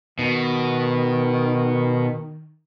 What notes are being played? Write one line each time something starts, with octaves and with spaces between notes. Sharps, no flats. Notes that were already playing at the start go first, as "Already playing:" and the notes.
B2 D#3